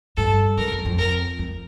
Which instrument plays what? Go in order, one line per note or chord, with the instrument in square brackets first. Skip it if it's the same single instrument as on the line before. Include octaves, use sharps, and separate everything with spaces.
[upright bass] G2 [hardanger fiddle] A4
[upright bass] G2 [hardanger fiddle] A#4
[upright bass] F#2
F2
[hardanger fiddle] A#4
[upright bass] F2